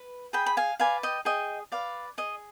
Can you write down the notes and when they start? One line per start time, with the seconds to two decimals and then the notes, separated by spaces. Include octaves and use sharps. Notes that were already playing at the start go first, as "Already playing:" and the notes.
Already playing: B4
0.33 G#4 G5 B5
0.46 B5
0.57 F5 G#5
0.80 B4 D5 F5 G#5
1.03 D#5 G5
1.25 G#4 D#5 G5
1.72 B4 D5 F5
2.18 G#4 D#5